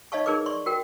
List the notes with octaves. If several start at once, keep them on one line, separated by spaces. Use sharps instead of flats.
D#4 C#5 D#5 F5 A5 C#6
D#4 G#4 A#4 B4 D6
D5 C6 C#6
F#4 A#4 G5